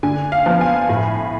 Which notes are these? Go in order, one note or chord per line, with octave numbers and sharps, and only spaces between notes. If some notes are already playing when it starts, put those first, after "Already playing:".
D3 G#5
F5
F3 B3
G#5
A2